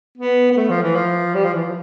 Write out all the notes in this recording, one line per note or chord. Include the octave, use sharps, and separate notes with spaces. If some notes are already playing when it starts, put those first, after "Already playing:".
B3
B3
A3
F3
E3
F3
G3
F3
E3
F3